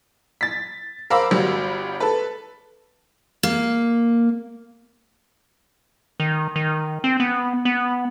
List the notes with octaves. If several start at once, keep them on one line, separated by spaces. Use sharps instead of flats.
A6 B6
A#4 C5 F5 B5 D6 E6
G1 G3 F#4
A4 B4
A#3
D#3
D#3
C4
B3
B3